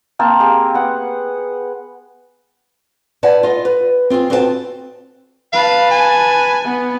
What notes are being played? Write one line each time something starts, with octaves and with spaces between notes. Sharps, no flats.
A#3 C4 A5
G4 G#4 F5
B3 F#5
E4 B4 D5 F#5 A5
F4 D#5
B4
C4 F4 F#4 G#4
C4 F#4 B4 C5 F#5 A5
B4 F5 A5
G#5
B3